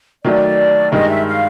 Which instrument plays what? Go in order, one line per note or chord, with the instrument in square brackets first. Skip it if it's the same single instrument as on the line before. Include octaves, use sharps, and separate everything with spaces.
[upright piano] D#3 F#3 A3 [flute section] D5
[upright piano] G2 D#3 G#3 [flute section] D#5
[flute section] E5
F5